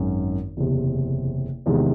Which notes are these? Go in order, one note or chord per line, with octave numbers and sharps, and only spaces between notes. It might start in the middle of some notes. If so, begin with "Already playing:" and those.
Already playing: G#1 F#2 D#3 G#3 C#4
F#1 E2 C3
E2 C3 D#3 G#3